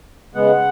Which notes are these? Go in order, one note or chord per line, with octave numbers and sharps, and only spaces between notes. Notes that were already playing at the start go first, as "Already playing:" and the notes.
C#3 G#3 B3 F#5